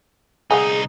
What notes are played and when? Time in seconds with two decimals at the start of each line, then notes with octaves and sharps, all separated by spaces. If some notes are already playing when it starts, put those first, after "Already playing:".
0.51 C2 D#4 G#4 F5 F#5 G#5